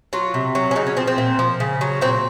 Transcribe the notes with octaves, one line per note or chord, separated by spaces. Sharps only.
F#3 F4
C3
F#3
C#4
C#3 D#4
C#4
F3 C4
C4
A#2
F3
C#3
F#3
A#2 C4